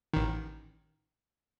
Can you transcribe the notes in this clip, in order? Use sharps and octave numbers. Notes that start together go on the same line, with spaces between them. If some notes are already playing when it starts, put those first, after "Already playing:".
A1 D#3